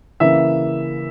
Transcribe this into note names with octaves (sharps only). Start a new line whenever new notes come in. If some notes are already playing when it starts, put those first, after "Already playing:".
C#3 E3 A#3 E5